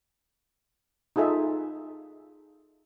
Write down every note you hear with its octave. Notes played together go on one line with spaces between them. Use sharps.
D#4 F4 G#4 A4 E5